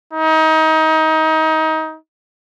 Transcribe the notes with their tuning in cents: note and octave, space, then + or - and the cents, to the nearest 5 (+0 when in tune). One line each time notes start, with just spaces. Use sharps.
D#4 +25